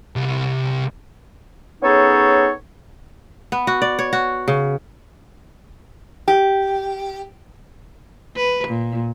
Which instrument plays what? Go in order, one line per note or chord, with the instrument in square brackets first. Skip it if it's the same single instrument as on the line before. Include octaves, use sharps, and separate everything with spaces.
[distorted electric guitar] C2
[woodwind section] B3 C#4 D#4 G#4 A4 C#5
[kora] B3
F#4
D5
C#5
F#4
C#3
[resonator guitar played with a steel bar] G4
[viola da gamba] B4
A#2